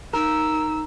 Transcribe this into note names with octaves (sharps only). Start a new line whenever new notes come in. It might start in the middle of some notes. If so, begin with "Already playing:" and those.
D#4 A#4 E6